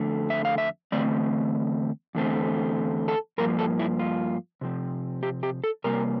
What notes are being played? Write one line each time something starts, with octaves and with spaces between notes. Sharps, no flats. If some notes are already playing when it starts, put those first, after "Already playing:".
Already playing: F2 D3 A3
E5
F5
E5
E2 D3 A3 C4 D5
E2 D3 A3 C4
A4
G2 F3 A#3 A#4
A4
E4
F4
C3 F3 C4
G4
G4
A4
C3 G3 A#3 A#4